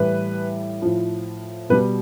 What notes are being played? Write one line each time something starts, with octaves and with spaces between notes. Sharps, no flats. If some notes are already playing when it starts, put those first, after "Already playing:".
Already playing: A2 E3 G3 B4
A2 F3
B2 G3 B4